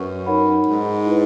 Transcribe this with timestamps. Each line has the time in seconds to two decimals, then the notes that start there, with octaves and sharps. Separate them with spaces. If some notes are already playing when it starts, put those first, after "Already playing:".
Already playing: F#2 B4 F#5 C#6
0.26 D#4 A#4 C#5 F#5 B5
0.67 G#2
1.06 E4 G#4 B4